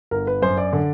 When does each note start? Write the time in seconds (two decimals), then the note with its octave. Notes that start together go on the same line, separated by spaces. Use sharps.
0.11 G1 A#4
0.27 B4
0.42 F#2 C5
0.58 D5
0.73 D3